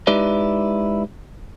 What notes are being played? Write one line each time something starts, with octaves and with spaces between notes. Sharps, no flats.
G#3 D#4 E4 G4 B4 D5